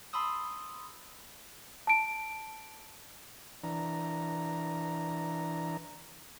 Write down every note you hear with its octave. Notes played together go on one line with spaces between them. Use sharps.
A5 B5 C6 D#6 E6
A5 D7
E3 D4 A#5